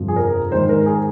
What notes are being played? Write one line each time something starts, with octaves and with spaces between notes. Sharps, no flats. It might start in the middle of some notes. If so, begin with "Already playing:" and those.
Already playing: G1 F2 C3 F3
G#4
A#4
G#2 D#3 G#3 C5
A#4
G#4